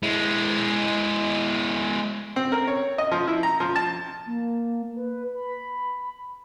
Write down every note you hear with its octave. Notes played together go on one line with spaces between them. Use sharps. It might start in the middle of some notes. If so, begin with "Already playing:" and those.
G#3 E4
C4
A#4
C#5
D#5
F3
E4
A#5
F3
A5
A#3
B4
B5